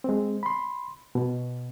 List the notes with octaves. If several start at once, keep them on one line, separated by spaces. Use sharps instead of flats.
G#3 C4
B5 C6
B2